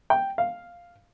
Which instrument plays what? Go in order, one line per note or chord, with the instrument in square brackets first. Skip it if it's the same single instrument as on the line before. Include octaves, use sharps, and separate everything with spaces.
[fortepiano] G5
F5